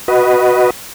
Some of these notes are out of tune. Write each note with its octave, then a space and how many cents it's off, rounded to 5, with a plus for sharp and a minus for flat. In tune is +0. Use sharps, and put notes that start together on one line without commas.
F#4 +0 B4 +0 D#5 +0